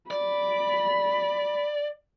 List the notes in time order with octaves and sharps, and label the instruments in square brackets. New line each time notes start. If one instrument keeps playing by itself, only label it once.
[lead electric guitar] D5 [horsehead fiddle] B5